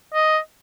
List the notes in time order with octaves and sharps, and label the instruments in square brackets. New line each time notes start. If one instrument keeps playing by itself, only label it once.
[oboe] D#5